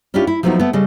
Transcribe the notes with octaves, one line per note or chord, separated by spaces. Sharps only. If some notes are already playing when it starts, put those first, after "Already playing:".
C#4 D4 E4 F4 G4
E4
F3 F#3 A3 B3 D#4 E4
A3 B3
C#3 G3 A4 D#5